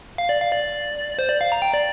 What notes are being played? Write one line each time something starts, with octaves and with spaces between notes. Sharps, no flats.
F5
D5
F5
D5
C5
D5
F5
A#5
G5
D5